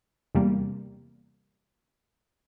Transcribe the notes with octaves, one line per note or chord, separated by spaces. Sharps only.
E2 C3 G3 A#3